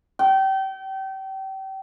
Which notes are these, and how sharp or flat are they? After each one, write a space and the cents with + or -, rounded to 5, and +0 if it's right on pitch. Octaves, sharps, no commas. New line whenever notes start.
G5 -30